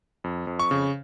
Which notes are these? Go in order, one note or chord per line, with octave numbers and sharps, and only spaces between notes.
F2
F2
C#6
C#3